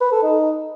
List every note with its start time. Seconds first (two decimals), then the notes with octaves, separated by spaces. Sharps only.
0.01 B4
0.12 A4
0.23 D#4